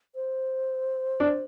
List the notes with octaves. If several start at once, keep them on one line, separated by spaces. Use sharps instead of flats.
C5
D4